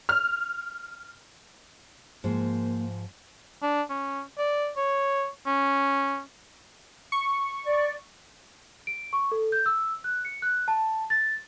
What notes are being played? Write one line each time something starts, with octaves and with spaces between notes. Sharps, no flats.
F6
G#2 F3 A#3
D4
C#4
D5
C#5
C#4
C#6
D5
D7
C#6
A4
G6
E6
F#6
C#7
F#6
A5
A6